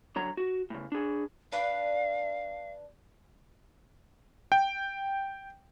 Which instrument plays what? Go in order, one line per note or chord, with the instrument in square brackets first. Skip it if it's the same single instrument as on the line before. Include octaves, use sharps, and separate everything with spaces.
[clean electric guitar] D3 F#3 C#5 A#5
F#4
A2 C#3
D4 G#4
[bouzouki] D4 B4 D5 [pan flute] F5
[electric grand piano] G5